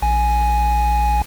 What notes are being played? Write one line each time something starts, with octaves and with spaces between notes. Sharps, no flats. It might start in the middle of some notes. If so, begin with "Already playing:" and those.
A#1 G#5